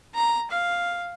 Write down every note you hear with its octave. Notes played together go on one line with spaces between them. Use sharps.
A#5
F5